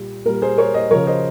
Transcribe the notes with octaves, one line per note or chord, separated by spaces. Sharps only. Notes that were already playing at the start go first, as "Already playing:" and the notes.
Already playing: A#2 G3
A#2 G3 A#4
G#4 C5
A#4 C#5
C5 D#5
C#3 F3 A#4 C#5
C5 D#5